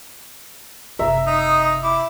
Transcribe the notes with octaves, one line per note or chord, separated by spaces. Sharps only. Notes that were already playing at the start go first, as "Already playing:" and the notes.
F#1 C3 E5 A#5
D#4 D#6
E4 D6